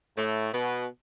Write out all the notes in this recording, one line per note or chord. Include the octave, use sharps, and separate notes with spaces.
A2 A3
B2 B3